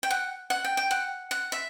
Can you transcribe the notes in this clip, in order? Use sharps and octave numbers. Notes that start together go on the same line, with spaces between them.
G5
F#5
F#5
G5
G5
F#5
F#5
E5